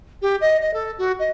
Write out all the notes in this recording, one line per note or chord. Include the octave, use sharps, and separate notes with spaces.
G4
D#5
D#5
A4
F#4
D#5